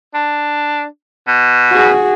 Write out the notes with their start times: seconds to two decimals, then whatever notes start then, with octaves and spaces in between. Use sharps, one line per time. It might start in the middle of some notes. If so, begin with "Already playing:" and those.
0.14 D4
1.27 B2
1.71 F#4 G#4